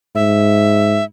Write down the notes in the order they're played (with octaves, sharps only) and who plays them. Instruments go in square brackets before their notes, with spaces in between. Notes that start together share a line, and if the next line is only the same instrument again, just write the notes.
[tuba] G#2 [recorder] E5